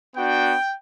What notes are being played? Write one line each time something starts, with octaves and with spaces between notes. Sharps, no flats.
B3 D4 F#4 G5